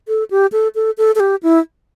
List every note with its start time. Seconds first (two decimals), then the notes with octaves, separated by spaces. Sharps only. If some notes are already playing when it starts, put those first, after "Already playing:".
0.08 A4
0.31 G4
0.52 A4
0.75 A4
0.98 A4
1.15 A4
1.20 G4
1.43 E4